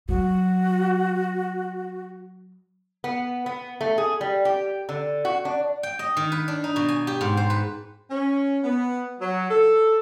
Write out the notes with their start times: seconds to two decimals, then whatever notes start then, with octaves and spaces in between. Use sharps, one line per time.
0.09 F#3 F#4
3.04 B3
3.46 B3
3.81 A3
3.98 G#4
4.21 G3
4.45 G4
4.89 D3
5.25 F#4
5.45 D4
5.83 G5
5.99 D#5
6.17 D#3
6.32 B4
6.48 D4
6.64 D#4
6.76 B2
6.88 G#5
7.07 G4
7.21 G#2
7.37 C5
7.50 B4
8.11 C#4
8.63 B3
9.20 F#3
9.50 A4